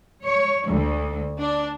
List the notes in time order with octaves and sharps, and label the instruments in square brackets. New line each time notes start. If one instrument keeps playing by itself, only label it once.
[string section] C#5
D2
D4